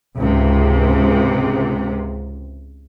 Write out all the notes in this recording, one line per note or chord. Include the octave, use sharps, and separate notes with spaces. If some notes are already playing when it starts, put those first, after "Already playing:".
C#2 G#2 C3